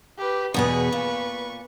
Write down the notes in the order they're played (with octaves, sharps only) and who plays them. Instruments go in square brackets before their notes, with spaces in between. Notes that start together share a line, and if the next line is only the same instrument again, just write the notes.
[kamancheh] G4 B4
[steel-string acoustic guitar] E2 B2 G#4 [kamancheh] B4 C#6
[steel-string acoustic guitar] A#2